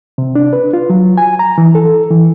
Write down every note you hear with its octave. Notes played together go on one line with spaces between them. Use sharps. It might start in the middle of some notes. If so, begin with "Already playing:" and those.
C3
D4
B4
F4
F#3
G#5
A#5
E3
A4
E3